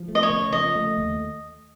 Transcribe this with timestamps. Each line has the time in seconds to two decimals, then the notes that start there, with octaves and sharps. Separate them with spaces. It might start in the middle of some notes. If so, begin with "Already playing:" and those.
Already playing: F3
0.08 A3
0.15 D#5
0.23 C#5
0.30 C#3
0.52 F3 D#5
0.75 A3
0.97 D#2